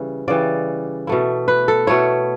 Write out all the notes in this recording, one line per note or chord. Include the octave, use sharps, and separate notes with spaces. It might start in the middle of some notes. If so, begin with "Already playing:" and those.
Already playing: C#3 E3 G3
C#3 E3 G3 D5
B2 A3 E4
B4
A4
B2 A3 E4 C#5